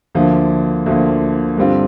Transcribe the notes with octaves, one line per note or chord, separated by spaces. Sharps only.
D2 D3 F3 A#3
D2 D3 F3 A#3
G2 D3 G3 C4 F4